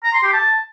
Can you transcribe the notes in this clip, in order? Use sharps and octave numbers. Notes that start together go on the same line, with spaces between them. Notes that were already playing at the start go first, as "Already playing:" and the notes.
A#5
C6
G4
A5